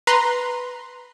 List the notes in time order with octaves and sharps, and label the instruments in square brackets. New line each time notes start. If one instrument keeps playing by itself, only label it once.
[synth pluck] B4 A#5 C6